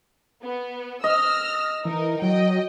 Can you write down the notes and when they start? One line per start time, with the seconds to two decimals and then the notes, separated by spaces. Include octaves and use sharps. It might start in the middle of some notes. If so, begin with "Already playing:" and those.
0.44 B3
1.04 D#5 E6 F6 A#6
1.85 E3 D#4 A#4
2.22 F#3 D#5 G5